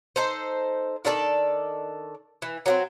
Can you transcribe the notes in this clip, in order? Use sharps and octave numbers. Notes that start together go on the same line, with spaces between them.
D#4 A4 C5
D#3 D4 A4 D5
E3
F#3 A#3 C4